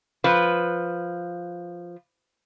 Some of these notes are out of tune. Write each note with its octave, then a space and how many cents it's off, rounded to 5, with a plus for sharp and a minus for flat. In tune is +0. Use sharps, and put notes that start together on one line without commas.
F3 +0 B4 +0